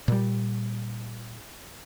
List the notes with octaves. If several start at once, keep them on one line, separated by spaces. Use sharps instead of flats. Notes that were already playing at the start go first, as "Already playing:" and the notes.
A#2 G3